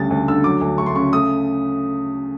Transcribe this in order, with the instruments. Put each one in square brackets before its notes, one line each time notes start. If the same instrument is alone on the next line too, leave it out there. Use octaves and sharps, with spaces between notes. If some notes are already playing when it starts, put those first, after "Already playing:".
Already playing: [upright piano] D2 C#3 G3 A6
D2
D3 E6
F#3 D6
D2
A3 C#6
C6
C#3 C#6
A3 D#6